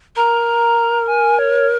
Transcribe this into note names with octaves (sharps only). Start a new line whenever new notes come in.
A#4 A#5
G#5
C#5